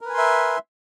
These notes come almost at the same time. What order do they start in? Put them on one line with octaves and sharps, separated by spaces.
A#4 B4 G#5 C6 E5